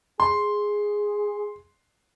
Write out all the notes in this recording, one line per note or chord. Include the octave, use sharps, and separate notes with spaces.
G#4 C6